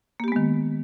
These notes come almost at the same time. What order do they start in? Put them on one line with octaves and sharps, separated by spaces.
A#3 G4 B3 G#3 D#3